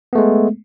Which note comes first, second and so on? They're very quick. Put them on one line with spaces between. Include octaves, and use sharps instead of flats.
B3 A3 G#3